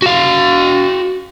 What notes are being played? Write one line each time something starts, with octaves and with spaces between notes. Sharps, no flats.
F#4 F5